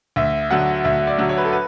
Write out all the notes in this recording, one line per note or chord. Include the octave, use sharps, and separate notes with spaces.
D2 E5
D3 F#3 F#5
D2 E5
D5
D3 F#3
C#5
B4
A4
B4